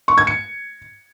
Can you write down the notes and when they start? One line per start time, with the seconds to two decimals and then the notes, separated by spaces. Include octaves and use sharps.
0.08 C#6
0.18 G#6
0.27 C#7